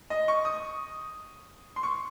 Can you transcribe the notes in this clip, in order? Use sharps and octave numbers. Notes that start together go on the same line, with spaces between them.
D#5
C#6
D#6
C6
C#6